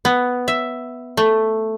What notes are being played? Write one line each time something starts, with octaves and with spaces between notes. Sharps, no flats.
B3
E5
A3